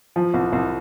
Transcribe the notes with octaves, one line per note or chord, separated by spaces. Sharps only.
F3
C2
C2